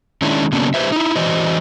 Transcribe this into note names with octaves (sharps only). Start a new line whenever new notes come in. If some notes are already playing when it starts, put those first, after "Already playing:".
D#3 G#3 C#4 D4 E4
C#3 F#3 A#3 B3 C#4 D4
E3 G3 G#4 B4 C5 E5
D#4 E4
E3 F#4 C5 D5 D#5